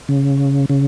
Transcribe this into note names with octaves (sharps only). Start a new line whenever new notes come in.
C#3
C#3